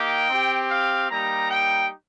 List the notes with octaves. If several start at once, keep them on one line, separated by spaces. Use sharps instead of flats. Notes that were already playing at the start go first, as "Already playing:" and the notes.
Already playing: A#3 D#4 G4 G5
C4 G4
F5
G3 A#3 D#4 G4 A#5
G5